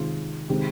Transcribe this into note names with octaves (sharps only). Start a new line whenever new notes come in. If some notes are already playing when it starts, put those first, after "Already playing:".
Already playing: C3 D#3 G#3 F4
C3 D#3 G#3 G4